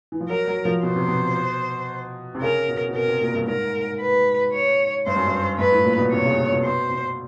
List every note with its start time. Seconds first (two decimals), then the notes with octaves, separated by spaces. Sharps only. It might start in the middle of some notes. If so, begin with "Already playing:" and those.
0.12 E3
0.21 F3
0.29 F#3 A#4
0.47 F#3
0.65 F3
0.83 B2 C5
0.96 C3
1.08 B2
2.35 C3
2.42 C#3 A#4
2.68 B2
2.89 B2
2.94 C3 A#4
3.08 C3
3.21 A#2
3.35 G2
3.47 G#2 A#4
4.01 B4
4.53 C#5
5.06 G2 C5
5.16 F#2
5.27 G2
5.59 G2 B4
5.72 A2
5.85 A#2
5.98 B2
6.11 C3 C#5
6.26 C#3
6.38 C3
6.52 B2
6.64 B2 C5
6.91 B2